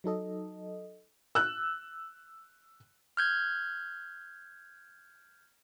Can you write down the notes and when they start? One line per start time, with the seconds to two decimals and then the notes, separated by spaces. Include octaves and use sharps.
0.04 F#3 D#4 A4 D#5
1.35 E6 F#6
3.17 F6 G6 G#6